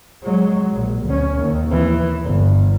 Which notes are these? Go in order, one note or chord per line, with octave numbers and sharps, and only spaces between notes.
F#3 G#3
A#1
D2 C#4
D#2
E3
G1